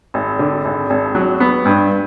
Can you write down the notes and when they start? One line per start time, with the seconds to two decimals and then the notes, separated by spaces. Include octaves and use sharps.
0.14 G#1
0.39 D3
0.65 G#1
0.90 G#1
1.15 F#3
1.40 B3
1.65 G2